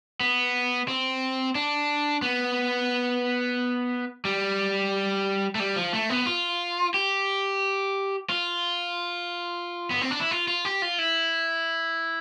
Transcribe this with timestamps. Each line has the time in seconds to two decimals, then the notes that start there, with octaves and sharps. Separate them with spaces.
0.20 B3
0.88 C4
1.55 D4
2.22 B3
4.25 G3
5.55 A3
5.60 G3
5.76 F3
5.93 A3
6.10 B3
6.26 F4
6.94 G4
8.30 F4
9.91 B3
10.01 C4
10.11 D4
10.21 E4
10.31 F4
10.48 F4
10.65 G4
10.82 F4
10.99 E4